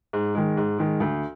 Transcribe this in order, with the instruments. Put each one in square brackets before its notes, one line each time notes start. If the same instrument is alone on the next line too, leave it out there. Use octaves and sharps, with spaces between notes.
[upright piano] G#2
D#3 G#3
G#2
D#3 G#3
D2